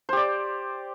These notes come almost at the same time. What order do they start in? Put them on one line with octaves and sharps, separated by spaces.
C5 G4 D5